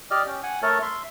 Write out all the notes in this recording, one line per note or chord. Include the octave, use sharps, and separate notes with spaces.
G4 D5 D#5 F6
C#4 G5
F#5 G#5
A3 A4 A#4 C#5 A5
E5 C6